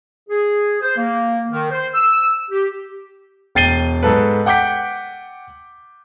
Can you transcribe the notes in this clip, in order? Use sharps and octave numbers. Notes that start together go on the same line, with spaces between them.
G#4
C5
A#3
D#3
C5
E6
G4
E1 G5 A6 C7 D#7 G7
G#2 A4 B4
F#5 G5 D6 G6 B6 D7